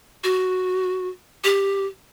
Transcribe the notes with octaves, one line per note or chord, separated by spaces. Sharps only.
F#4
G4